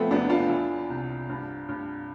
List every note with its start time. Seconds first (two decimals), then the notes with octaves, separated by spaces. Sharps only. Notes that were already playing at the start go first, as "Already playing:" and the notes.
Already playing: F3 A3 B3 C4
0.11 E2 B3 D4
0.30 D4 F4
0.49 E3
0.90 C2
1.29 G2
1.68 G2